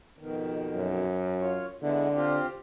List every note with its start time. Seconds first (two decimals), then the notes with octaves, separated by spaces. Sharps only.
0.19 F2 B2 D#3
0.75 F#2
1.40 F4 C#5
1.82 D3 G#3 B3 E4
2.14 C4 F4 G4